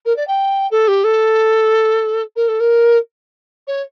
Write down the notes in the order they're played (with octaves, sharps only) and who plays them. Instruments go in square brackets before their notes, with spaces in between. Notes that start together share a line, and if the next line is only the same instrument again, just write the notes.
[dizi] A#4
D5
G5
A4
G4
A4
A#4
A4
A#4
C#5